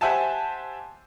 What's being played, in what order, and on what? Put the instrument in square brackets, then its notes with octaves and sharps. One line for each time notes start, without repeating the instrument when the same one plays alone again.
[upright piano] G4 C5 E5 F#5 G#5 A5